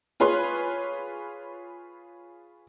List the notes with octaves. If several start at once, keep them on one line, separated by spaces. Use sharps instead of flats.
F4 G#4 B4 C#5 C6